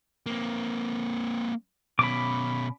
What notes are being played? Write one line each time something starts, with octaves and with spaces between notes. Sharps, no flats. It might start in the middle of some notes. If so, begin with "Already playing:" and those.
A#3 C4
B2 C#4 B5 D6